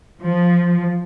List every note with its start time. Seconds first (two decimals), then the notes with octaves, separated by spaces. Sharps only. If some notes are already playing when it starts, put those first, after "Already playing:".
0.22 F3